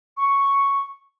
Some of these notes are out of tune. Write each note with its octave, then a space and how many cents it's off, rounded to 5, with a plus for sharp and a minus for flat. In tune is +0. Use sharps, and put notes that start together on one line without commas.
C#6 +0